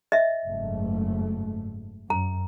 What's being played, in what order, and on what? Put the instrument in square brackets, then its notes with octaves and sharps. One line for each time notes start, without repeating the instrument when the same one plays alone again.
[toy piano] D#5 E5
[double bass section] F#1 G#2 A3
[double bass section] F#2 [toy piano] A#5